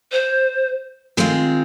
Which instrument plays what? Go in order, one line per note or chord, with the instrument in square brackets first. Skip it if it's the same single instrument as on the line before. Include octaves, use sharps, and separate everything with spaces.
[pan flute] C5
[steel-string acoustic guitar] D#3 G#3 C4 F4 G#4